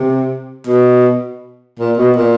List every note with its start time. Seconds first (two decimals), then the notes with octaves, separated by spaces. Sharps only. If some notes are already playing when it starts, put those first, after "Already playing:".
Already playing: C3
0.67 B2
1.79 A#2
1.98 B2
2.16 A#2